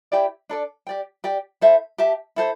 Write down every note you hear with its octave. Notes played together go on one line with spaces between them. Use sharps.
E4 G4 D5 G5
D4 A4 D5
G4 D5 G5
G4 D5 G5
E4 A4 C5 E5
G4 E5 A5
E4 A4 C5